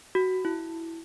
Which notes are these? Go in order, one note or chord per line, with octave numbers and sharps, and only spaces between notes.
F#4
E4